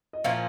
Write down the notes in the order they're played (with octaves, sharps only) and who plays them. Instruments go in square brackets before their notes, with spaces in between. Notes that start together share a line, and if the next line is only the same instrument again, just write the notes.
[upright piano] D#5
[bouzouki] A#2 F3 A#3 C#4 [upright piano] F5